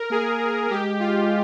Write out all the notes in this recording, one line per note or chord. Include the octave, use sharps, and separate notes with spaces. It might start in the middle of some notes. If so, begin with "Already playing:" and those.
Already playing: A#4
A#3 G#4
G#3 G4
F4